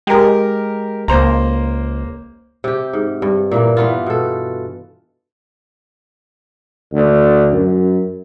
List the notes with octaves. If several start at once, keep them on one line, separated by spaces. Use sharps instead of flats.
G#3 G4 A#4
C#2 A#3 C5 A#5
C3 G4
G#2
G2
A#2 E3 A#3
E3 B3 F4
B2 A4
D2
F#2